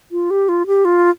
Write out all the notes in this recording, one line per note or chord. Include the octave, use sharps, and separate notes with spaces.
F4
G4
F4
G4
F4